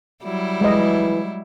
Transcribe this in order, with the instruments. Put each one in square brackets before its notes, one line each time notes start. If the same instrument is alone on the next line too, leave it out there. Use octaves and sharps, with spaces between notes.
[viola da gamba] F#3 G3 E4
[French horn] E3 [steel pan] G#3 D#5